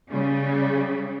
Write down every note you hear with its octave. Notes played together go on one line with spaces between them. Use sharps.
C#3 G3 C#4